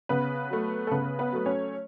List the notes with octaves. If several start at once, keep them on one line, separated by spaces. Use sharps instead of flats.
C#3 B3 B4
F#3 A3
A4
C#3 B3 B4
B3 B4
F#3 A3
C#4 C#5